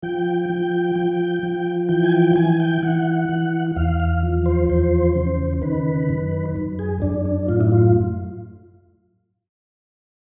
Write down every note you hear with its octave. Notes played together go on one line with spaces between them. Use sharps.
F3 G5
F3
F3
F3
E3 G5
G#5
G5
E3 G#5
G5
E3 F#5
E3
E2 F5
F5
F3
C5
E2 C5
C#3
D#3 B4
F#2
F#2
G#4
F#2 D4
D4
A2 F4
E4
F4